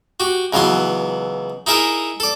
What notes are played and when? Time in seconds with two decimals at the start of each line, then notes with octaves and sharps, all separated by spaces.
0.20 F#4 G4
0.53 C#2 E3 F#3 B3 C6
1.67 D#4 E4 G#4 A#4 E5
2.20 A4 D5